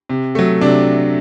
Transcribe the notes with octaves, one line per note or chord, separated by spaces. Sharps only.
C3
F#3 A3
C3 D4